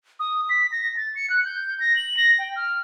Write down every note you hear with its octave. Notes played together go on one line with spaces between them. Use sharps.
D#6
B6
A#6
A6
C#7
F#6
G6
A#6
F#7
A#6
G5
F6